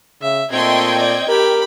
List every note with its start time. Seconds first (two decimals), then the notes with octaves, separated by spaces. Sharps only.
0.22 C#3 E5
0.52 A#2 A3 C4 D#5 G5 C6 G#6
0.97 D5
1.29 G4 A#4 B5